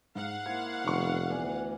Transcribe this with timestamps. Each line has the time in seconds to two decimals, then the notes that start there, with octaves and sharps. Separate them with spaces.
0.15 G#2 F5 F#5
0.46 A#3 E4 C5 G#6
0.85 F1 D#3 B3 C#6
1.30 D2 E3 B3 D5 G#5